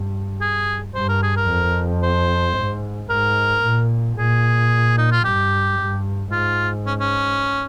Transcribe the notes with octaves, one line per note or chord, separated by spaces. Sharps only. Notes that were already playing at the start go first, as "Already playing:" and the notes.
Already playing: G2
G#4
G2 C5
A#4
G#4
A#4
F2
C5
G#2
G#2 A#4
A#2
A#2 G#4
D#4
F4
G2 G4
G2
G#2 F4
C#4
C#4